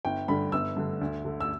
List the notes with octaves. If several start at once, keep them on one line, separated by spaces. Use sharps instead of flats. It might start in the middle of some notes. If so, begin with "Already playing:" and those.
G1 G5
G2 D3 B5
G1 E6
G2 D3
D2
D3
E6